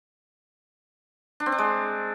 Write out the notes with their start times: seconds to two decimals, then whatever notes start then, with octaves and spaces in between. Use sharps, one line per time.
1.40 D4
1.46 C4
1.52 D4
1.58 G#3